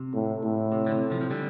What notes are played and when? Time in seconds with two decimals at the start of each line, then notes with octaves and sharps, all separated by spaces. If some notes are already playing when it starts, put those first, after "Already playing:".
Already playing: C3
0.14 A2
0.43 A2
0.72 C3
0.87 D3
0.91 C3
1.10 C3 F3
1.21 F3
1.30 D3 G3